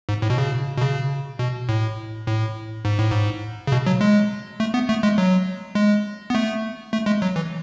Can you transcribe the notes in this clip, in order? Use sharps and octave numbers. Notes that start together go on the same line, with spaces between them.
G#2
A2
B2
C#3
B2
C#3
B2
A2
A2
G#2
A2
G#2
C#3
B2
F#3
G#3
A3
B3
A3
G#3
F#3
G#3
B3
A3
A3
G#3
F#3
E3